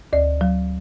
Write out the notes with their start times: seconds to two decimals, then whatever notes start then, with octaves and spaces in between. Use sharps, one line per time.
0.13 D2 D5
0.41 F#3